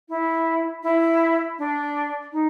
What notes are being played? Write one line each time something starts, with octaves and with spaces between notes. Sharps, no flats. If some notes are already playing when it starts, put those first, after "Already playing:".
E4
E4
D4
D#4